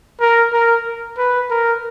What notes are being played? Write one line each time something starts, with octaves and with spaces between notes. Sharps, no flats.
A#4
A#4
B4
A#4